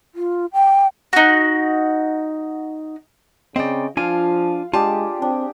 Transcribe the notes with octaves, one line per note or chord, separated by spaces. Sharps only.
F4
G5
D#4 F#4
C#3 C4 D5 D#5 G5
F3 D4 F4 F5 G#5
G#3 D4 F4 G4 G#4 A5
C4 D4